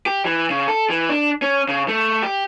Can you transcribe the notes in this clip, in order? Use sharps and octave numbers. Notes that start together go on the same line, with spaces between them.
G4
E3
C#3
A4
E3
D4
C#4
C#3
A3
G4